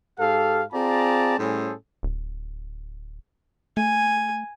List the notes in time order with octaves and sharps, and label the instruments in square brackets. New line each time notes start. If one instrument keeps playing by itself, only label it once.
[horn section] G#2 G4 A4 F5
C4 F4 G#4 D5 A5 A#5
A2 G3 C#4 G#4 A4 C5
[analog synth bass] D1
[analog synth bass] A3 [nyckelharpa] G#5